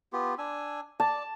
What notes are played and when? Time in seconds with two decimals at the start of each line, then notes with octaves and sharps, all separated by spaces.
0.13 B3 F4 G4
0.38 D4 G#5 E6
1.00 D5 A5